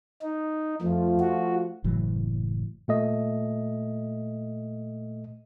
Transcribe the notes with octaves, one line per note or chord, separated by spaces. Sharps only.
D#4
F2 F3 A3 F4
F#4
F#1 A2 E3 F#3
A#2 A3 D#5